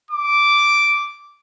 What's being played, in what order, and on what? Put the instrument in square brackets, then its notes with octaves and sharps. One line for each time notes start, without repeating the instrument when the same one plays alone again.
[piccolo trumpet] D6